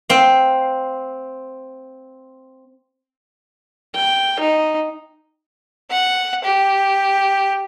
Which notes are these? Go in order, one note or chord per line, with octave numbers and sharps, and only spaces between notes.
C4 F5
G5
D#4
F#5
G4